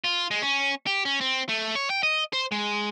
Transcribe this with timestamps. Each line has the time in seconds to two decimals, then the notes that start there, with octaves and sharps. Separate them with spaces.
0.04 F4
0.31 G#3
0.42 C#4
0.87 G4
1.05 C#4
1.21 C4
1.49 A3
1.75 C#5
1.90 G5
2.03 D#5
2.33 C5
2.52 G#3